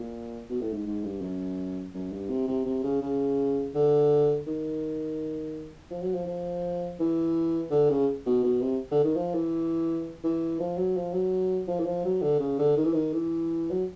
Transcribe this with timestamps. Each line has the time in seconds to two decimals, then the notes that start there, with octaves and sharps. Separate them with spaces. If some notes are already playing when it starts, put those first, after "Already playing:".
Already playing: A#2
0.50 B2
0.61 A2
0.74 G#2
0.86 G#2
1.04 G2
1.22 F#2
1.94 F#2
2.12 G2
2.30 C3
2.48 C3
2.66 C3
2.84 C#3
3.02 C#3
3.75 D3
4.47 D#3
5.91 F3
6.02 F#3
6.14 F3
6.26 F3
7.00 E3
7.71 D3
7.90 C#3
8.26 B2
8.44 B2
8.61 C3
8.92 D3
9.04 D#3
9.16 F3
9.34 E3
10.24 E3
10.60 F3
10.78 F#3
10.97 F3
11.14 F#3
11.68 F3
11.80 E3
11.86 F3
12.05 F#3
12.22 D3
12.40 C#3
12.59 D3
12.77 D#3
12.85 E3
12.94 D#3
13.13 E3
13.71 F#3